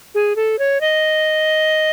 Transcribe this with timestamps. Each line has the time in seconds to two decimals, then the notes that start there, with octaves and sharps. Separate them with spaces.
0.15 G#4
0.36 A4
0.59 C#5
0.81 D#5